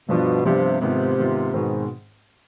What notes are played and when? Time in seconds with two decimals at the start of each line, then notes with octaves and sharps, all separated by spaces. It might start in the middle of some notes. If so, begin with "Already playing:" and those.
0.09 G2 B2 F3 B3 D4 F4
0.44 G2 C3 F3 B3 D4 F4
0.81 G#2 C3 D#3 B3 F4
1.18 G#2 D#3 B3 F4
1.53 G#2 B2 D#3 G#3 C4